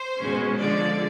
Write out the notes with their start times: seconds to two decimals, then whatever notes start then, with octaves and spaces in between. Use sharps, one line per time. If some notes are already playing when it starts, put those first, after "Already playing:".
Already playing: C5
0.18 B2 G#3 C#4
0.58 D3 F3 G#3 D5